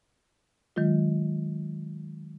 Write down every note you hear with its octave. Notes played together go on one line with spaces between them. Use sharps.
D#3 F#3 G#3 F4